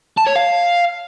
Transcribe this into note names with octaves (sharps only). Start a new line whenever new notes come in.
A5
C#5
F5